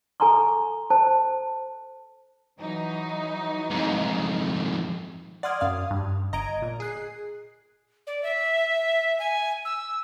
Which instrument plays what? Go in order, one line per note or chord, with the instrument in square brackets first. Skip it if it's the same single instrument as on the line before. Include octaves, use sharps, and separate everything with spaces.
[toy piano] A4 G#5 A#5 C6 C#6
C5 A5
[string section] E3 F#3 D#4
[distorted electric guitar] F2 G#2
[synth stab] D5 F#5 C6 D#6 F6 G#6
F#2 F5 D#6
G2
G1 D#5 A#5 G#6 D7
A#2
G#4 F#6 C7
[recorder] D5
E5
G#5
E6